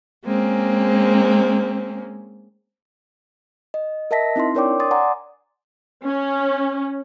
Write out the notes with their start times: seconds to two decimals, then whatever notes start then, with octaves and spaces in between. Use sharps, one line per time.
0.24 G#3 A#3 C4 C#4
3.74 D#5
4.11 A#4 D#5 E5 A5 A#6 B6
4.36 C4 D#4 E4 C6
4.55 D4 A#4 C#5 D5 G5 D6
4.80 C6 D6 D#6 A6
4.91 D5 F#5 G#5 A#5 C6 D6
6.06 C#4